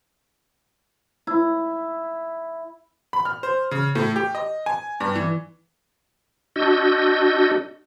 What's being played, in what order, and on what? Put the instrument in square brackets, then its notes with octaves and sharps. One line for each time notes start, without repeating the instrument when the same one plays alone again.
[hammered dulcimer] E4
[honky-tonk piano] B5
F6
C5
C#3
A2
G4
D#5
G#5
G2
E3
[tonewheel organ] D4 F#4 D#5 E6 G6